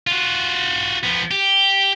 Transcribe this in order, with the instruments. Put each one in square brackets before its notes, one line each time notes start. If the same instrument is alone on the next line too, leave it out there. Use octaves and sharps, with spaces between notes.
[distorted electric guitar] F4 F#4
F3 B3
G4